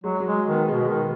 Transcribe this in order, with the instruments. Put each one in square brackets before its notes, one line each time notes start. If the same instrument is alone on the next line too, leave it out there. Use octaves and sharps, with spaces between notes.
[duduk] F#3 [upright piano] G#3
[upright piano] F#3
[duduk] G#3
D#3
[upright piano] B3
[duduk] B2 [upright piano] G#3
[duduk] D#3